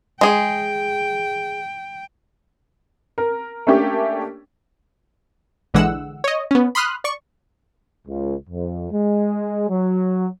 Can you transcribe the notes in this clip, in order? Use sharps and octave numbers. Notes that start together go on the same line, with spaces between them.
G#3 G#4 G5
A#4
A3 A#3 C#4 D4 G4
A#1 D3 E3 G#3 F#5 E6
C#5 D#5
B3 C#4
B5 C6 D#6 F6 F#6
D5 C#6
C#2
F2
G#3
F#3